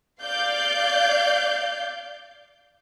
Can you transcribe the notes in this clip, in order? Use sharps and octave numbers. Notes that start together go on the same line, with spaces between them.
D5 F5 G6